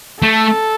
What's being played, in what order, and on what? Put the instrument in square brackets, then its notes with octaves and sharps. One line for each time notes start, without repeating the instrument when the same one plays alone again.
[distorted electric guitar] A3 [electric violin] A4